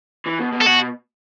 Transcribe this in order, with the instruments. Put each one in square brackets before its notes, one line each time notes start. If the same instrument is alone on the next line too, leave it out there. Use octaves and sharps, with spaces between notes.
[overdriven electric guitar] E3
B2
B2
[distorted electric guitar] A4
[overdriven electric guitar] B2 [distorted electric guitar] F#4